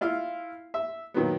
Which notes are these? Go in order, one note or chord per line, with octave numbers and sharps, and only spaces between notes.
E4 F4 F5
E5
A#2 D#3 F#3 B3